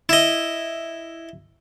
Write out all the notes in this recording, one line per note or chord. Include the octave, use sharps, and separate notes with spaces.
E4 D#5